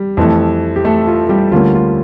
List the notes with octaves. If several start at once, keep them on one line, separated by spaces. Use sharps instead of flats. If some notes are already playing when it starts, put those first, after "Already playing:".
Already playing: G3
F2 E3 A3
G4
A3 A4
F4
G3 G4
D2 D3 G3 A#3 C#4 F4
F4